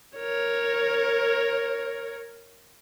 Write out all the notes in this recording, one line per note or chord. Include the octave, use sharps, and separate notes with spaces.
A#4 C#5